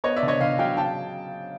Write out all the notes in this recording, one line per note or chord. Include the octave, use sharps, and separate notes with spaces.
B3 C#5 D#5
D5 E5
D3
C#5 D#5
D3 D#5 F5
F#3 F5 G5
C#3 G5 A5